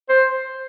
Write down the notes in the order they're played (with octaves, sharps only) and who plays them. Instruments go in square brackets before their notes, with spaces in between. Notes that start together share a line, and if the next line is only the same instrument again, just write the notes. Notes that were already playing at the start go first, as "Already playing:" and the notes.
[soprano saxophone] C5